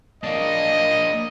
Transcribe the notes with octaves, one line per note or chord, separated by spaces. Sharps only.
A#3 D4 D#5